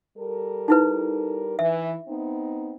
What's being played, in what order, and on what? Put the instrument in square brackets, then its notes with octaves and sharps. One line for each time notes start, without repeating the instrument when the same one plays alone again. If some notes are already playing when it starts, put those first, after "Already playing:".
[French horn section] G3 A4 A#4
[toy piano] D#4 E4 B4
[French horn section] E3 [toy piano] E5
[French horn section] B3 C4 D#4